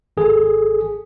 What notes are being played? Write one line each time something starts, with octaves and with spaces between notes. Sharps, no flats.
G#1 G#4 A4